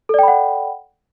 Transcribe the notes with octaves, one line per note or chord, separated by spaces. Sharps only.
A4 D5 F#5 G5 B5